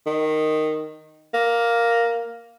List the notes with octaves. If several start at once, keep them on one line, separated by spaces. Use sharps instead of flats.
D#3
A#3